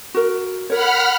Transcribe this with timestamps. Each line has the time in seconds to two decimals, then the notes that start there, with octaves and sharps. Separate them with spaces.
0.14 F#4 A#4
0.70 A#4 C#5 F#5 B5 F6